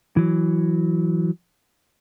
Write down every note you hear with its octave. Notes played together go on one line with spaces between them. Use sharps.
E3 F#3